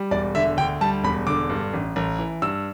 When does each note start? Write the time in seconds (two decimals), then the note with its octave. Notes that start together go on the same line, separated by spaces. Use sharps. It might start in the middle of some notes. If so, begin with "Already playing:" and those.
Already playing: G3
0.11 E1 D5
0.35 D3 E5
0.57 D2 G5
0.81 G3 A5
1.04 E1 B5
1.27 D3 D6
1.50 G2
1.73 A1
1.96 A1
2.19 E3
2.42 G2 E6